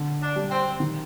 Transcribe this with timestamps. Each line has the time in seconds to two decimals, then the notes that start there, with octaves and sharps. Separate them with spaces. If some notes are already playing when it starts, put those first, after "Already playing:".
Already playing: D3
0.22 D4
0.36 G3
0.51 C4
0.80 D#3